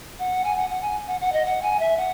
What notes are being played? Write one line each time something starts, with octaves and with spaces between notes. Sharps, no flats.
F#5
G#5
F#5
F#5
G#5
F#5
F#5
D#5
F#5
G#5
E5
F#5